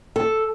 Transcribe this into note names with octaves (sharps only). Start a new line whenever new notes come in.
A4